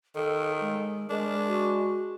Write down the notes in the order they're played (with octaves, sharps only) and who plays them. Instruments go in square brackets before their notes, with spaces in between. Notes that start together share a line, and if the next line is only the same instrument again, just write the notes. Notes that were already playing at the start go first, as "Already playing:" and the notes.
[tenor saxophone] D#3 [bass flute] A4
[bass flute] G#3
[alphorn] G#3 [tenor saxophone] D4 [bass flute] A#4
[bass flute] F#4